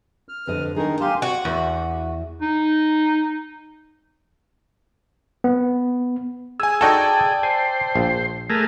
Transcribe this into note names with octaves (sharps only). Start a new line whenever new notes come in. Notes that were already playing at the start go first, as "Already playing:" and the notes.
F6
F2 D3 B4 D#5
D#3 D4 D#4 G#4 A#4
G4 F5 G#5 A5 C6
F#4
E2
D#4
B3
G#4 G#5 E6
D#4 F#4 A4 D5 G5 A5
C5 G#5
A#1
A3 G#4 A#4